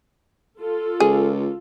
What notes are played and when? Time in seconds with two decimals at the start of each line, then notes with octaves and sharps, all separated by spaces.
0.59 F4 A4
1.00 C#2 G#4